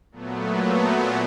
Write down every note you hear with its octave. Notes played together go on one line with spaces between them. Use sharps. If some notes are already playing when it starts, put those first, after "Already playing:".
A#2 F#3 A3 B3